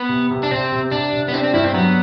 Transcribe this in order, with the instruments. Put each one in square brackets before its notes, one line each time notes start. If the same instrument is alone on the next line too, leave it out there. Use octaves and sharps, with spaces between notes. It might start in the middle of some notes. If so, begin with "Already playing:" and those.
Already playing: [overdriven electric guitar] B3
[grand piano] C3
C3
[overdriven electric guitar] D4
[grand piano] C3 [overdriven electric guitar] C4
[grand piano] C3
[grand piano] C3 [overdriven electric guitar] D4
[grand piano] C3
[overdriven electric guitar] B3
[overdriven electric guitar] C4 [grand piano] D4
[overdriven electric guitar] C4
[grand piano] G2 [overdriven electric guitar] E4
[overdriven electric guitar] C4
[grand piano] F#3 [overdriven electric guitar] B3